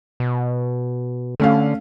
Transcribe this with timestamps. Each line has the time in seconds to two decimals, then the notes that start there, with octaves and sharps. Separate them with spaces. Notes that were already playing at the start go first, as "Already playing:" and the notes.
0.20 B2
1.40 D3 A3 C#4 F5